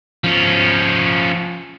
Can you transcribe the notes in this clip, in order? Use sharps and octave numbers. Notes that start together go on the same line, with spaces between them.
F3 C#4